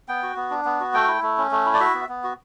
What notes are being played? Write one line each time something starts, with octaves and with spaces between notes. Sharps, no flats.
B3 G5
F#4
B3
D4
B3
F#4
A3 G5
E4
A3
C#4
A3
E4
D5
F#4 E5
B3
B3
F#4